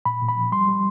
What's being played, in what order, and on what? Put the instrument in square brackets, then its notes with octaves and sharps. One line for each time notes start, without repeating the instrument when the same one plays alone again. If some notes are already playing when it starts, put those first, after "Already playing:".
[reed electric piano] A#2 B5
A#2
B5
F3
G3 C6
G3